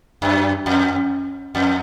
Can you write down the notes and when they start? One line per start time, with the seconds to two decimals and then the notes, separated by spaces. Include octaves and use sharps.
0.22 F#2
0.66 F2
1.55 F2